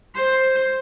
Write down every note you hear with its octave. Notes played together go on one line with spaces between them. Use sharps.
C5